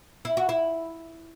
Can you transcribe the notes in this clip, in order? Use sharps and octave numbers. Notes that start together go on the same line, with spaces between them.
E4
F#4
E4